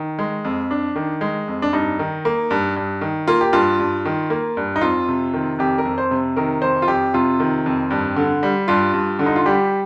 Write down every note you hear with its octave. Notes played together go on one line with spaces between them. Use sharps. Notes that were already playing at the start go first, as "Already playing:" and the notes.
Already playing: D#3
G#3
F2
D4
D#3
G#3
F2
D4
G2 D#4
D#3
A#3
G2
G2
D#3
A#3 F4
G4
G2 F4
G2
D#3
A#3
G2
D#4
F2 F4
C3
D#3
F2 G4
A#4
F2
C5
C3
D#3 A#4
F2 C5
F4
F2 G4
C3 F4
D#3
F2
G2
D3
G3
G2 F4
G2
D3
D#4
F4
G3 G4